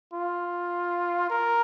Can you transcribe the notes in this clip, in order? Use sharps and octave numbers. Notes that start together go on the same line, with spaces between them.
F4
A#4